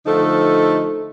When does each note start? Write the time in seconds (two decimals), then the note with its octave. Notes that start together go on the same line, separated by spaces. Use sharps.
0.06 D3 F3 A3 D#4 A4